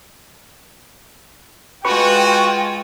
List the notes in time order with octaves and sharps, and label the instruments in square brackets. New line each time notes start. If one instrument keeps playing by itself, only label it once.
[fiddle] G#3 F4 [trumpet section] F#4 [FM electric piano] B4 C#6 [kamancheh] G5